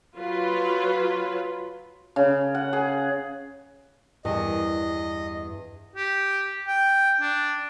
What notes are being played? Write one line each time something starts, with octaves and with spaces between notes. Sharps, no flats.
F#3 F4 B4
C#3
F#5
G#4
E2 G2 D#5
G4
G5
D4